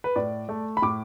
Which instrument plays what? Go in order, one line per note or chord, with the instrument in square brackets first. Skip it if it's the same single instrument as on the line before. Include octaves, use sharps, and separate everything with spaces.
[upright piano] B4
A2 D5
A3
B5
A2 D6